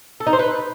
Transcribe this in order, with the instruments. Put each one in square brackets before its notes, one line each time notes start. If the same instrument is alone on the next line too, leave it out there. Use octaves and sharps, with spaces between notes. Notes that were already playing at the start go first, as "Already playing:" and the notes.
[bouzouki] A4
D#4
C5
B4